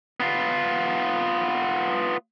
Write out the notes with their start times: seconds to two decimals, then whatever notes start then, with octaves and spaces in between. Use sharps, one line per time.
0.20 B3 F4